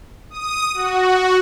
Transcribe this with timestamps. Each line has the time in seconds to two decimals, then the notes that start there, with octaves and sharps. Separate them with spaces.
0.30 D#6
0.74 F#4